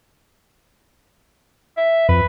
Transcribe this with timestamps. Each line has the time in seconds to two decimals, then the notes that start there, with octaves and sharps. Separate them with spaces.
1.78 E5
2.09 F2 B4